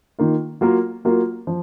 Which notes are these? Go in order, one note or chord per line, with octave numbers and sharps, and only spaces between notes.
D#3 A#3 F4
F#3 A#3 F4 A#4
F#3 A#3 F4 A#4
F3